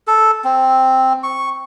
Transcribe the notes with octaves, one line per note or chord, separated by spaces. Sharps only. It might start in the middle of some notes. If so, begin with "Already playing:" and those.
A4
C4
C#6